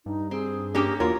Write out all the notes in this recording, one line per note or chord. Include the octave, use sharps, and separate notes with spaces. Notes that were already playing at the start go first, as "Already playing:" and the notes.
G2 D#4
C4 G#4
A#3 C#4 D4 G4 G#5 D6
E2 A#3 F4 F#4 A#4 C#5